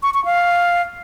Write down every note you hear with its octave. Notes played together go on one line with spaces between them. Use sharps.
C#6
C#6
F5